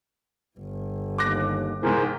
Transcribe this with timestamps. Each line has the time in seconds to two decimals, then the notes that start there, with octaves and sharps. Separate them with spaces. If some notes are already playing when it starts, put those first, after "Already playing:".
0.58 G1
1.18 D#2 D6 F#6 A#6
1.83 G#2 C3 E3 G#4 A#4 C5